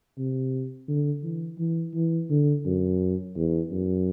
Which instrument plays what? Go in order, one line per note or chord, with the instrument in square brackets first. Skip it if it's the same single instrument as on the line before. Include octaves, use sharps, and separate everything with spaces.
[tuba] C3
D3
E3
E3
E3
D3
F#2
E2
F#2